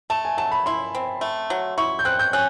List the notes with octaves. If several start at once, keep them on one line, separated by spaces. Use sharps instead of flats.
A3 A5
G#5
F#3 A5
B5
E4 C6
C4
A3
F#3
E4 C#6
G6
C4 F#6
G6
C#4 F#6